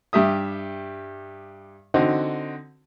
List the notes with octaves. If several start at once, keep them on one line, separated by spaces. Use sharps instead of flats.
G2 G4 E5 D#6
D3 C4 D#4 F#4